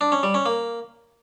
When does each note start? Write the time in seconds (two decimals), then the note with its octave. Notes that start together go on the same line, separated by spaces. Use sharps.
0.01 D4
0.12 C#4
0.23 G3
0.34 C#4
0.46 A#3